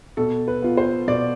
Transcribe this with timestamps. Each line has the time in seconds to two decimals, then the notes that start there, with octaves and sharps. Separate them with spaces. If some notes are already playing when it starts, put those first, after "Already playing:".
0.17 B2 A4
0.48 B4
0.62 B3 F4
0.77 C5
1.07 B2 D5